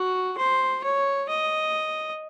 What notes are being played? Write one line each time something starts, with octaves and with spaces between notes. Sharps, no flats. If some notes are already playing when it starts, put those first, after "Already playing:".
Already playing: F#4
C5
C#5
D#5